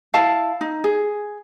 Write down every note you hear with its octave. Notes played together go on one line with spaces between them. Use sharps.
E4 F5 A5
D#4
G#4